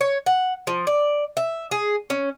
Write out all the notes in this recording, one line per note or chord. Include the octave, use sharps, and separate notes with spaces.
C#5
F#5
F3
D5
E5
G#4
C#4